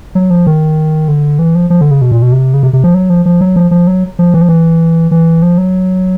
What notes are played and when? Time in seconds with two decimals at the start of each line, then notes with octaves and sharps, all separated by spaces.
0.15 F#3
0.30 F3
0.47 D#3
1.08 D3
1.39 E3
1.55 F3
1.70 F3
1.81 D3
1.91 C#3
2.02 B2
2.11 A#2
2.22 B2
2.32 C3
2.54 C#3
2.63 C3
2.73 C3
2.84 F3
2.94 F#3
3.10 F3
3.26 F3
3.41 F#3
3.56 F3
3.71 F3
3.87 F#3
4.19 F3
4.34 E3
4.41 F3
4.49 E3
5.11 E3
5.42 F3
5.58 F#3